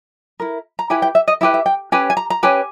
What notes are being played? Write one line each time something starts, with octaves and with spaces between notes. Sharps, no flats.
E4 A#4
A#5
E4 G4 B4 G#5
G5
E5
D#5
E4 G4 B4 E5
E5
G5
C#4 G4 B4 G#5
G#5
A#5
A#5
C#4 G4 B4 G#5